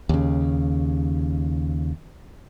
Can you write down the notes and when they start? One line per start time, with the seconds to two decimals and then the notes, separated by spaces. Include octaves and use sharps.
0.09 D#2 C#3